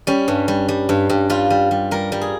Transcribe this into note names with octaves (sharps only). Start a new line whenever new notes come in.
G3 C#4
G2
G3
G3
G2
G2
G3 F4
G3
G3
G3 A#4
G3
G#4